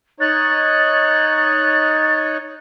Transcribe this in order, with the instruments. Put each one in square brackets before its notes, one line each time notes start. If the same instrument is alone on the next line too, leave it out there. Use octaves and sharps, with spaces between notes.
[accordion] D#4 C#5 [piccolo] F#6 [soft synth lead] A6